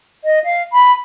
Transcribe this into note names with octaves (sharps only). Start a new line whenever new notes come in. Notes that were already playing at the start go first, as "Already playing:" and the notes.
D#5
F5
B5